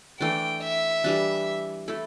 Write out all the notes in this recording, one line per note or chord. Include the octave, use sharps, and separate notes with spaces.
E3 A3 D4 G5
E5
E3 G3 D4
A3 E4 A4